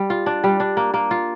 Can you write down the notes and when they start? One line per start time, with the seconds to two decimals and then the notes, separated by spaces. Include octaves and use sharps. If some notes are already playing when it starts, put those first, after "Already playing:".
Already playing: G3
0.10 F4
0.26 D4
0.44 G3
0.60 D4
0.77 A#3
0.94 A#3
1.11 F4